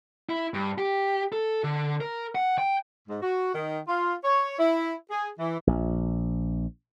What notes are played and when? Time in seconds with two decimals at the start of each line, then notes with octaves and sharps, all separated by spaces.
0.29 E4
0.54 G2
0.78 G4
1.32 A4
1.64 D3
2.00 A#4
2.35 F#5
2.58 G5
3.08 G#2
3.22 F#4
3.54 D#3
3.88 F4
4.24 C#5
4.59 E4
5.10 G#4
5.39 E3
5.67 A#1